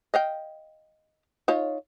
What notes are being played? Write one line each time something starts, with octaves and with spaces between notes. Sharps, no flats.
D#5 F5 G5
D#4 F4 C#5